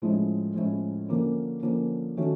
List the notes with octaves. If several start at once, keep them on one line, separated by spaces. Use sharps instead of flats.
A2 F3 G#3 C#4 E4
A2 F3 G#3 C#4 E4
D3 F3 A#3 C#4
D3 F3 A#3 C#4
D#3 F#3 A3 C#4